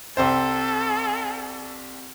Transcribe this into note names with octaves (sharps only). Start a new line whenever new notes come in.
C2 C4 A4 C5